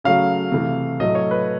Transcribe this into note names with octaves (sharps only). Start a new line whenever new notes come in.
C#3 F#3 A3 F5
C3 E3 A3
A2 F#3 A3 D#5
C#5
B4